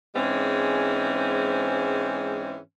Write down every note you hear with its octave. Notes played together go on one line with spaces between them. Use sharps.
G#2 E3 G#3 C4 C#4